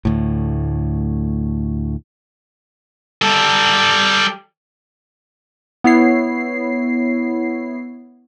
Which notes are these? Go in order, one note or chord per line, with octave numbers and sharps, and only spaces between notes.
D2 A2
G3 A4
B3 E4 C#5 C7